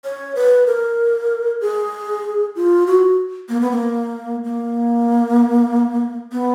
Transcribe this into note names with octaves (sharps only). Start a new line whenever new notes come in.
C#5
B4
A#4
G#4
F4
F#4
A#3
B3
A#3
A#3
B3